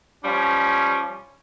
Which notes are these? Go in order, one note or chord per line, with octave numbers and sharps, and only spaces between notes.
F3 G3 C#4